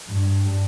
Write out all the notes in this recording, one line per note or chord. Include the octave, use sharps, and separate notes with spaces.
G2